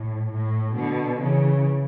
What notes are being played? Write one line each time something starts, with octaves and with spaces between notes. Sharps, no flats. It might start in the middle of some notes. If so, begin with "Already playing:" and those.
Already playing: A2
A2
B2 D3
C#3 E3